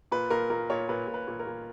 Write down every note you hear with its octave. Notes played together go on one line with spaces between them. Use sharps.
A#2 B4
A#2 A#4
A#2 A#4
A#2 C#5
A#2 B4
A#2
B4
A#2
A#4
A#2